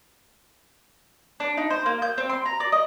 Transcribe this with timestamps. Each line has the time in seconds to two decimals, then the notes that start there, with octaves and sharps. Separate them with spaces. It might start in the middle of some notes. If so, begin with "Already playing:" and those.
1.40 D4
1.57 D#4
1.70 C5
1.86 A#3
2.02 G6
2.18 C4
2.29 C6
2.46 A#5
2.60 D5
2.72 D#5